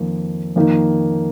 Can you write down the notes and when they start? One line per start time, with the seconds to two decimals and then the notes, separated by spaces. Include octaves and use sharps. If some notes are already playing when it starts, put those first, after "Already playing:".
Already playing: F2 D#3 A#3
0.56 F2 D#3 A#3 D#4